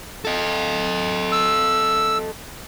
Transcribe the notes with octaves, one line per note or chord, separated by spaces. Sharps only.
A4 D#5
E6